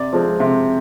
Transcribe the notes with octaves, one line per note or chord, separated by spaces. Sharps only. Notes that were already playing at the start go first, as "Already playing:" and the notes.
Already playing: C3 D5
F3 G#3 C4
C3